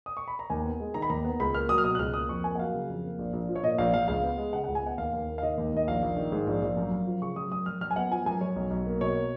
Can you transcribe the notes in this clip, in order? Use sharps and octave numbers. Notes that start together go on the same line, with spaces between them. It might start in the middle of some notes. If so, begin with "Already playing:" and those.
D#6
C#6
B5
A#5
D#2 G#5
B3
G#3
D#3 A#5
B5
D#2 A#5
B3
C#2 B5
A#3 F6
F#3 D#6
F6
B2 D#6
F#6
C#2 F6
A#3 D#6
F2 C#6
A#3 G#5
F#5
F#3 F5
C#3
F2
A#3
A#1
A#1
F3
C#5
A#2 D#5
A#1 F5
A#1 F5
C#2 F5
B3
G#3
C#3 F#5
C#2 F#5
G#5
B3 F#5
D#2 F5
D#2
A#3
F5
D#3 D#5
D#2
D#2 D#5
A#1 F5
A#1
D#3
G#2
A#1
A#1
F#2
F#2
F3
C#3 C#6
F#2 D#6
F#2 D#6
F#2 F6
F#2 F6
G#5
B3 F#5
F3 G#5
F#2 G#5
F#2 C#5
B1
B1
A#3
B2 C#5